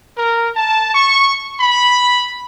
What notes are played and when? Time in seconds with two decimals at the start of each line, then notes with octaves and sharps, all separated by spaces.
0.16 A#4
0.55 A5
0.94 C#6
1.59 B5